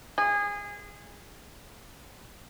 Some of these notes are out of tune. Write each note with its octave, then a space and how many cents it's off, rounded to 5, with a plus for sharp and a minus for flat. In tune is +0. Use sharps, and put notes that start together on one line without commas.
G#4 -25